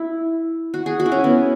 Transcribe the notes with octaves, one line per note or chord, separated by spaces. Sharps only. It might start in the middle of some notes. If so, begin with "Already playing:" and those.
Already playing: E4
F#4
G#4
F#4
E4
C#4
B3